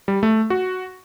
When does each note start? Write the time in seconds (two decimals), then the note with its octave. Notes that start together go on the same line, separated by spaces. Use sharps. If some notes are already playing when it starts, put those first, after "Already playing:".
0.08 G3
0.23 A3
0.50 F#4